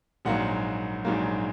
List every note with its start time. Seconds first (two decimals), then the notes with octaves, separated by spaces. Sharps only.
0.25 A#1 G#2 F#3 A#3 F#5
1.05 A#1 G#2 F#3 A#3